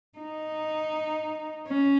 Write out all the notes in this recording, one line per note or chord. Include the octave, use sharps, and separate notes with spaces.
D#4
C#4